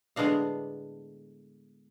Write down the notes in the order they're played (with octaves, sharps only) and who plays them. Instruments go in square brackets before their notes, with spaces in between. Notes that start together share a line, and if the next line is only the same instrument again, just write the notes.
[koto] A2 D3 G#3 B3 D4 F5